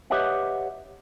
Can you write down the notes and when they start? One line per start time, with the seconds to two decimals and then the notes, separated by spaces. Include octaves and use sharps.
0.10 G4 B4 C#5 D#5 E5 F#5